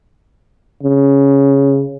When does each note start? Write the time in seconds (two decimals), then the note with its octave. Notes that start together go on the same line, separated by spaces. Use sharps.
0.83 C#3